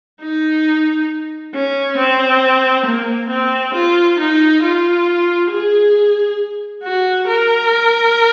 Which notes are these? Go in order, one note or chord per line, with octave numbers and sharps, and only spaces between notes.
D#4
C#4
C4
A#3
C4
F4
D#4
F4
G#4
F#4
A#4